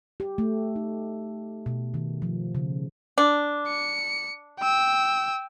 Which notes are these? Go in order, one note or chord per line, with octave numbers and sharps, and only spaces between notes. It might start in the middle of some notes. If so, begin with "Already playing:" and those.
G4
A3
D#4
B2
D#3
F3
C#3
D4
C#7
G5 E6